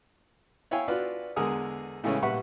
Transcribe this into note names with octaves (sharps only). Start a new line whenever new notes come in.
E4 C#5 F5 G5 G#5
D4 F4 F#4 B4 D5
E2 D3 G#3 G#4 A#4 D#6
A2 C#3 E3 G#3 A3 C#4
A#1 G3 B4 E5 F#5 C#6